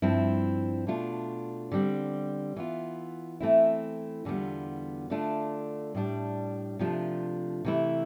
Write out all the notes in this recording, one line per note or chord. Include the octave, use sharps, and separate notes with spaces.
G2 F3 C4 E4
B2 A3 D4 F4
D3 G3 C4
E3 B3 F4
E3 A3 C4 E4
E2 D3 G3 B3 F4
D3 A3 D4 F4
A2 G3 D4
C3 F3 A3 D4 F4
C3 E3 A3 E4